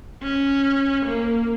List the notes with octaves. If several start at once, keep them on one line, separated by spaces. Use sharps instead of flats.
C#4
A#3